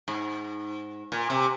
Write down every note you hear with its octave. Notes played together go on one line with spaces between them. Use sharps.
G#2
A#2
C3